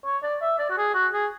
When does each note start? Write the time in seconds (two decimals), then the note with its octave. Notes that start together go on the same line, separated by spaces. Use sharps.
0.05 C#5
0.23 D5
0.42 E5
0.59 D5
0.70 F#4
0.77 G#4
0.94 F#4
1.13 G#4